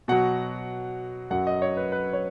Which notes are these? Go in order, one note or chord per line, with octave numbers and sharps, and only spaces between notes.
B2 F#3 F#5
F#2 F#3 F#5
D#5
C#5
B4
B4
C#5